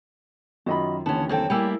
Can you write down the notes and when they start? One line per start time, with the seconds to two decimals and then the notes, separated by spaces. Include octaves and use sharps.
0.66 F#2 D#3 F4 F#4 D#5 B5
1.06 D#2 D3 E3 B3 C#4 A5
1.29 F#2 C4 A4 C#5 G5
1.50 G3 A#3 E4 G#5 E6